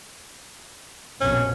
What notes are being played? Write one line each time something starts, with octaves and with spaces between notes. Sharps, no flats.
A#1 F2 B2 C#4